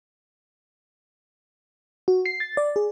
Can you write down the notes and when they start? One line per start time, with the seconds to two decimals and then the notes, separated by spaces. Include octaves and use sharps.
2.08 F#4
2.26 C7
2.40 A6
2.57 D5
2.76 G#4